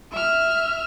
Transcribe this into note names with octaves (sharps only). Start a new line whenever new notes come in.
E5 F6